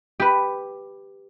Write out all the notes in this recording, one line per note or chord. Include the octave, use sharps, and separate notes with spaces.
G4 B4